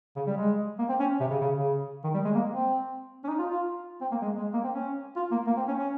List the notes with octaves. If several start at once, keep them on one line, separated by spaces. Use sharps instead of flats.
C#3
G3
G#3
A#3
C4
C#4
C3
C#3
C#3
C#3
D#3
G3
G#3
A#3
C4
C#4
D#4
F4
F4
C4
A#3
G#3
G#3
A#3
C4
C#4
F4
A#3
A#3
C4
C#4
C#4